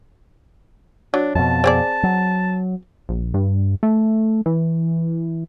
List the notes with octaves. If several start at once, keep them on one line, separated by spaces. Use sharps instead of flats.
F#3 D4
F2 B2 A5
C4 G#4 D5
F#3
A#1
G2
A3
E3